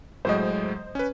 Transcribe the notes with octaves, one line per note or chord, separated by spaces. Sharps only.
A2 F#3 G#3 C5 D#5
C#4 B4